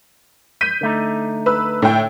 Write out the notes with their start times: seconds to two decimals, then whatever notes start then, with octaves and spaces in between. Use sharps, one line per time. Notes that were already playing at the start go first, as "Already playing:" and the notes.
0.61 G6 B6 D#7
0.81 D3 A3 D#4
1.46 B4 E6
1.82 A2 G5